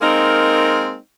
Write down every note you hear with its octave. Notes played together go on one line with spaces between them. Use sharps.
G#3 A#3 C4 D#4 A#4